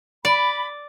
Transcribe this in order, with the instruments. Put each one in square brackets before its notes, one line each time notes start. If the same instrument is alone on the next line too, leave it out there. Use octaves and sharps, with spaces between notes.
[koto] D5 [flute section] B5